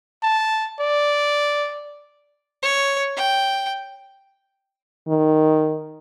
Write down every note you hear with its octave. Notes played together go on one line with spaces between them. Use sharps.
A5
D5
C#5
G5
D#3